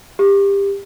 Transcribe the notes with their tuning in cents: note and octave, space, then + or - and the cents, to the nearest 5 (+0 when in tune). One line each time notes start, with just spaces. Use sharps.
G4 +25